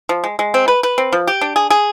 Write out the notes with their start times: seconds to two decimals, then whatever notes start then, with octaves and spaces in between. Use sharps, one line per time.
0.09 F3
0.24 G#3
0.39 G#3
0.54 C4
0.68 B4
0.83 B4
0.98 C4
1.13 F3
1.27 G4
1.41 D4
1.56 G#4
1.70 G#4